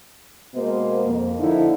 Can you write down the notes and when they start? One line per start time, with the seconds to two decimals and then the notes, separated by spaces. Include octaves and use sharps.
0.54 B2 G#3 A#3 B3 C5 D#5
1.04 F2 A#3
1.39 D3 F3 D#4 E4